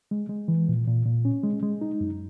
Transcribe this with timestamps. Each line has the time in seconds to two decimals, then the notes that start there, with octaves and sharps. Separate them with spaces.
0.11 G#3
0.29 G#3
0.48 E3
0.68 A#2
0.87 A#2
1.06 A#2
1.25 C#4
1.44 G#3
1.63 G#3
1.81 D#4
2.01 F#2